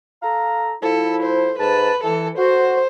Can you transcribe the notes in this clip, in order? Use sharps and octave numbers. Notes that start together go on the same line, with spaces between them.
A4 F5 A#5
F3 E4 A4
C5
G#2 B4 A5
E3 A4
F#4 C5